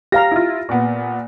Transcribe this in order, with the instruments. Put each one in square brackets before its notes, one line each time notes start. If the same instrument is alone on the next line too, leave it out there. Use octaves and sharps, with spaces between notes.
[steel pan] G4 F5 A#5 [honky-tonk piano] A#6
[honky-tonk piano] E4 F4
A#2 B3